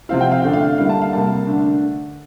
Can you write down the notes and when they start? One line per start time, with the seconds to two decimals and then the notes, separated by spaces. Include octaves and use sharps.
0.09 C3 F3 C4 E4 F5
0.21 G5
0.32 F5
0.42 D3 A3 D4 G5
0.53 F5
0.78 D3 G3 A#3 E4 F5
0.89 A5
1.02 F5
1.13 C3 G3 A#3 A5
1.47 D3 A3 D4